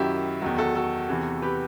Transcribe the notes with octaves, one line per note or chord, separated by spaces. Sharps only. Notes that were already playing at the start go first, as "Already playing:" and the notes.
Already playing: F#2 D#3 F#3 E4 G4
E2 D#3 F#3
F#4 A4
F#4 A4
E2 C3 E3
G4 B4